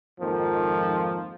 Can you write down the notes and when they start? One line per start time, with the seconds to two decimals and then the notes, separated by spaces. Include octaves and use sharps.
0.20 F2 G#2 D#3 F3 A#3